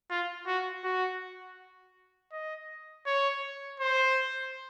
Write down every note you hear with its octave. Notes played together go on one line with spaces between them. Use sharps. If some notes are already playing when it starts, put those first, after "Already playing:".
F4
F#4
F#4
D#5
C#5
C5